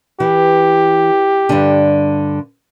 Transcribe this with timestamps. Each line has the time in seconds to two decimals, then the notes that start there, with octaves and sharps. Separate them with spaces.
0.20 E3 G4
1.49 G2 D3